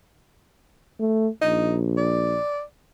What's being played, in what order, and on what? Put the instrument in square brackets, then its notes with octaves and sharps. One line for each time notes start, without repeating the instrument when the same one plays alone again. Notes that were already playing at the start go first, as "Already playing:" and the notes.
[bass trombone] A3
[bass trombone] A#1 [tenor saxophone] D#4
[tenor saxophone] D5